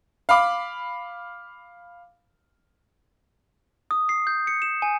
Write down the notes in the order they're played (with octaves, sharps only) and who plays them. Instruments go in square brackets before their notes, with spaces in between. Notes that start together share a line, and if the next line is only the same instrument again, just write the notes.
[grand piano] F5 B5 D6
[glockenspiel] D#6
C7
G6
C#7
E7
G#5